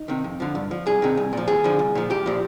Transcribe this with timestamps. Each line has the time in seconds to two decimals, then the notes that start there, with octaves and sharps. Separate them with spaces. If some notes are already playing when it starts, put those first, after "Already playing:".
Already playing: D#4
0.08 C3 D#3
0.24 F2
0.40 D3 F3
0.55 G2
0.71 F3
0.86 C2 G#4
1.02 C3 D#3
1.17 C2
1.33 A#2 F3
1.48 D#2 G#4
1.64 D3 F3
1.79 C2
1.95 A#2 F3
2.10 C2 G4
2.26 A#2 F3